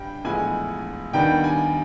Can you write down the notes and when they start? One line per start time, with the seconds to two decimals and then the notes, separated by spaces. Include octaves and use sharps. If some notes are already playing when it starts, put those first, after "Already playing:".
Already playing: G2 G3 G5
0.25 A#1 A2 E3 G#3 B3 G#5
1.13 D#2 D#3 G3 B3 D4 G5
1.44 G#5